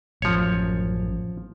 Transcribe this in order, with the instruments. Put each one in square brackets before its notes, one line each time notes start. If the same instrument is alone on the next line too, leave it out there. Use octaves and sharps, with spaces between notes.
[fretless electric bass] A1 F#2 [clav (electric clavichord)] F3 C#5